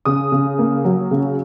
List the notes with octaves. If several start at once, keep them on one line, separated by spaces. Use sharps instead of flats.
C#3 D#6
C#3
A#3
F#3
C#3